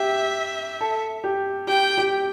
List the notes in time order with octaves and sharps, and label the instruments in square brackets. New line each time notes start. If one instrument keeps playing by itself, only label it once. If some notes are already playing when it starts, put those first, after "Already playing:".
Already playing: [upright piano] G4 [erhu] E5
[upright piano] A4
G4
[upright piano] G4 [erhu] G5
[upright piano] G4